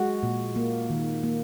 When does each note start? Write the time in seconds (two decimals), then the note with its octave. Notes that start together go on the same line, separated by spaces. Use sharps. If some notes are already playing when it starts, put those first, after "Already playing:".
Already playing: G#3 F#4
0.23 A#2
0.56 A#3
0.90 D#3
1.23 A#3